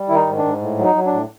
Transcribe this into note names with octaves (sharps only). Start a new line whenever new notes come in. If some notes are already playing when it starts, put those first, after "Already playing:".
Already playing: G3
D#3 E4
D#4
G#2
D4
G#2
A2
F#3
D#4
F#3
D4
A2